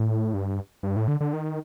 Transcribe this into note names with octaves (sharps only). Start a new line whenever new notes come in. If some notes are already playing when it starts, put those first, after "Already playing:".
Already playing: A2
G2
G2
A2
D3
D3
D#3